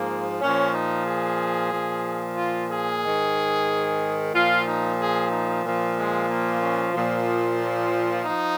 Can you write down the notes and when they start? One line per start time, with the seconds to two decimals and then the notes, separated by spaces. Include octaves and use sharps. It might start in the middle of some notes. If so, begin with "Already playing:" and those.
Already playing: G#2 F3 A#3
0.41 A#2 F3 C#4
0.73 D#4
1.06 G#4
1.71 A#2 F3
2.37 F4
2.69 G#4
3.02 G#2 D#3
4.33 A#2 F3 F4
4.65 D#4
4.99 G#4
5.31 D#4
5.63 A#2 F3
5.96 G#3
6.29 A#3
6.61 C#4
6.94 A#2 F3
8.25 F3 D#4